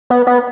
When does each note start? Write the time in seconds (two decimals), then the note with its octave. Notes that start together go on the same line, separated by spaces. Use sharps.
0.10 B3
0.27 B3